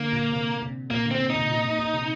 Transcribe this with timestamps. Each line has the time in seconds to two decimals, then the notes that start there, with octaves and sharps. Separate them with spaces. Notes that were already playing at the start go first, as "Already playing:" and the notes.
Already playing: D3 A#3
0.13 A#2
0.32 C3
0.62 C3
0.90 A#2 A#3
1.06 D3
1.11 C4
1.20 C3
1.30 D#4
1.35 A#2
1.50 A#2
1.65 A#2
1.79 A#2
1.94 C3